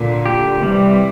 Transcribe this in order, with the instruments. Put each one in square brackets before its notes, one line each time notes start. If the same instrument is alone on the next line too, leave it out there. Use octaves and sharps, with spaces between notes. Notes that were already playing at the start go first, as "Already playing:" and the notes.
Already playing: [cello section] A#2 D3
[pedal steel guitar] G4
[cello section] C3 E3 [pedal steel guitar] G3